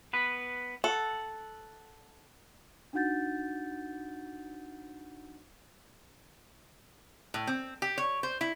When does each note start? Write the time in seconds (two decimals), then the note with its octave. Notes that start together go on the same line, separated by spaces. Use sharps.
0.13 B3 B4
0.84 A4 F#5
2.93 D4 D#4 F#4 F#5 G6 A6
7.34 A2
7.47 C4
7.82 G4
7.98 C#5
8.23 C5
8.41 E4